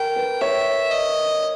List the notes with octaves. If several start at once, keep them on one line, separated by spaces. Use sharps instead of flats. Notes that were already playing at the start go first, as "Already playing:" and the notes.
Already playing: A#4 G5
B4
C#5 E5
D#5